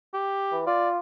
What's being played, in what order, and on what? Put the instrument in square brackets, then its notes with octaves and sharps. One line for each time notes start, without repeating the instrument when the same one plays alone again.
[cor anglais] G4
[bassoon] E3
[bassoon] F4 [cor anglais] D5